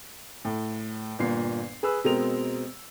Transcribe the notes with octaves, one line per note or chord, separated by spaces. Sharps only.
A2
G1 A#2 C7
G#4 B4 E6
B2 G#3 C4 A#4 F7